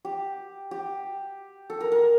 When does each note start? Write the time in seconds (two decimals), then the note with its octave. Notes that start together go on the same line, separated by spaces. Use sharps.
0.05 G4
0.71 G4
1.70 A4
1.81 A#4
1.92 A#4